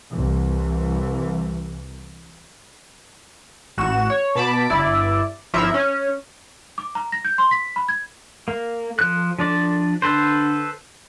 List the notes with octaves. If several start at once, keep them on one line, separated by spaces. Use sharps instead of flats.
C2 E3
A1 F#4 E7
C#5
B2 A5 B5 D6
G1 E4 D5
G#1 F3 E4 E5 A#5
C#4
D6
A#5
A#6
G6
C6
B6
B5
G#6
A#3
F3 A4 F#6
F3 D4 D5
D3 A4 B4 C5